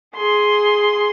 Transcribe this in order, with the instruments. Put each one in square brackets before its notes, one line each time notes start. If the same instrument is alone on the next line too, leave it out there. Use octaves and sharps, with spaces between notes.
[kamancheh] G#4 C6